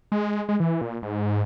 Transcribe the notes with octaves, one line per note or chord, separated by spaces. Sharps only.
G#3
G#3
E3
A#2
G#2